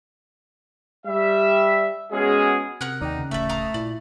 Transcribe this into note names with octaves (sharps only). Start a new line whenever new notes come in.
G3 E5
G#3 B3 C#4 F#4 G#4
C3 A#4 F#5 F#6
D#2 D#3 D#4 D5 G5
C#3
D1 A1 A3 D5 E5
F5 A#5 D#6
A#2 E4 D5